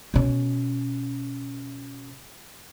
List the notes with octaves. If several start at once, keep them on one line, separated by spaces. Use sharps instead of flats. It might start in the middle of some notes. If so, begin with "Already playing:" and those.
B2 C#4